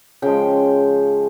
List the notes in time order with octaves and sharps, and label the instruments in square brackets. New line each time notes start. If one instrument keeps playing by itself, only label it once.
[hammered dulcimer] C#3 F3 G#3 G5